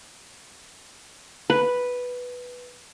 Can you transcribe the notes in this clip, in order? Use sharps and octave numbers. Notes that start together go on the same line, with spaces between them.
B4